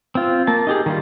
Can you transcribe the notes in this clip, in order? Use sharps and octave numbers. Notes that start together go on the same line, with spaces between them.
C4 F4
A#3 A5
D#4 G4 G#4
D#3 G3 F4